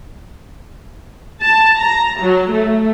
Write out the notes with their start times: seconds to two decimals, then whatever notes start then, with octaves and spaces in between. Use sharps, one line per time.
1.43 A5
1.81 A#5
2.21 F#3
2.53 A3